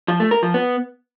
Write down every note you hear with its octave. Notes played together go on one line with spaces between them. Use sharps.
F3
A3
A#4
F3
B3